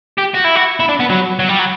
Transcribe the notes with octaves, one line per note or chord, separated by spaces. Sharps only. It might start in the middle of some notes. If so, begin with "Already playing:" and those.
G4
F#4
E4
F#4
E4
D4
B3
F#3
F#3
G3
F#3